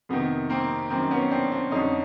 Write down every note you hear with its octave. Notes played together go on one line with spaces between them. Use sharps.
F2 C3 D#3 B3
A#3 C4
F#2 D#3 A#3 C4
B3 C#4
C4 D4
C4 D4
F2 D3 C#4 D#4